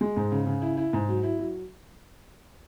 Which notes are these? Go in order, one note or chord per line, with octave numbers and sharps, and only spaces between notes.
G#3
G#2
C#3
C#3
E4
E4
G#2
F#3
E4
F#3